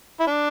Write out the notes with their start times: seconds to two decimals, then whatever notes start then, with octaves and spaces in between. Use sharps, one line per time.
0.20 E4
0.27 D4